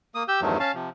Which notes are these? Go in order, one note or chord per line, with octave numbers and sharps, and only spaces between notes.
A#3 D#6
G4 E6 G6
E2 G2 D#3 F3 F#3 A3
C#4 F5 A5
C3 F3